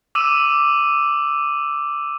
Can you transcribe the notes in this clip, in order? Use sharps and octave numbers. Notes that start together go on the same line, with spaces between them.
D6 E6 D#7 E7